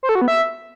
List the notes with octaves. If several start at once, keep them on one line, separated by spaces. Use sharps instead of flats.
C5
A4
F#4
B3
E5